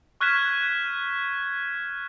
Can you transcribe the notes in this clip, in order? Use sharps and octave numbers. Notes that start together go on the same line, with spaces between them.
C#6 F6 F#6 G#6 B6 E7